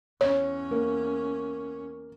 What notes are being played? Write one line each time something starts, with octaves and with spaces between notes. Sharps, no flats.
E2 C#4 C#5
A#3